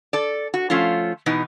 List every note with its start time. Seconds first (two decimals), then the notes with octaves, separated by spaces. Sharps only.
0.13 A4 D5
0.54 F#4
0.70 F3 A3 C#4 F4
1.26 B2 E3 B3 D#4